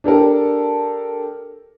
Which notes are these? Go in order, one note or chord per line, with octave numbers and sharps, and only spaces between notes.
D4 G4 A4 A#4